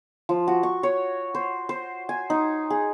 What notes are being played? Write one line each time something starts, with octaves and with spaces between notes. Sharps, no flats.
F3
F#4
C#6
C#5
C5
C5
G#5
D#4
G#4